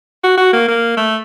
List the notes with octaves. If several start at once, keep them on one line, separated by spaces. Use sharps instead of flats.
F#4
F#4
A#3
A#3
A3